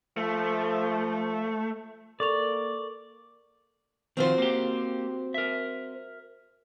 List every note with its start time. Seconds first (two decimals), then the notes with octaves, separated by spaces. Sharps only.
0.17 F3 A3
2.20 A#3 A4 A#4 D5 C#6 F7
4.17 D#3 F3 C4 F4 F#4 C5
4.38 A#3 G4
5.34 A#4 E5